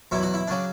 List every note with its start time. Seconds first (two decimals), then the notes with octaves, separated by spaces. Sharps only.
0.11 E2 B2 F#3 E4
0.23 F#4
0.34 E4
0.48 C#3 F#3 D4